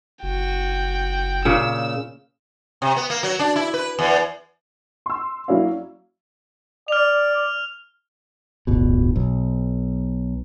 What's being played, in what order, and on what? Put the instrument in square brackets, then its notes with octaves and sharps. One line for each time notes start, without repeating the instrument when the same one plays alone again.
[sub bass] F#1 [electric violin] F#4 G5
[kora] A#2 C#3 [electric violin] E6
[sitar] C3
B3
A#3
F#3
D4
E4
B4
E2
[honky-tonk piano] C6 E6
F#3 A#3 C#4 E4 D5 F5
[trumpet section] D5 [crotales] F6 F7
[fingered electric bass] D1 G1 B2
B1